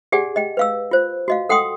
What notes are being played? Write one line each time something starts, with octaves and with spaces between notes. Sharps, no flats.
G4 G#4 D5 F#5 G#5
D#5 G5
B4 F5 E6
F4 C5
F#4 D#5 F5
A4 F#5 G5 C6 D#6